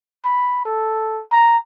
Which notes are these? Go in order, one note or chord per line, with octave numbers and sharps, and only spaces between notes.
B5
A4
A#5